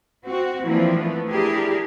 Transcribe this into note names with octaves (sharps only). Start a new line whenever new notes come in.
C4 F#4
E3 F3 A#3 C4 D4 E4
F3 A3 B3
D4 E4 G4 G#4 A#4